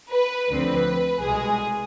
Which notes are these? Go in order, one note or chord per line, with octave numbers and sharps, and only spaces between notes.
B4
D2 D3 F3 C4 B4
C2 B2 G#3 G#4